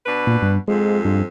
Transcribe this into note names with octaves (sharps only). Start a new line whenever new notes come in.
B2 D4 B4
A#2
G2
F2 G#2 F3 G#3
G2